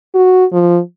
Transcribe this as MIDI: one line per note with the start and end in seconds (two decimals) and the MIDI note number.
0.14 0.45 66
0.52 0.79 53